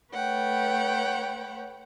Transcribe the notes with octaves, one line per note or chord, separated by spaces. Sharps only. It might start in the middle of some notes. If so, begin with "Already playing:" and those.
A3 B4 C#5 F#5 G5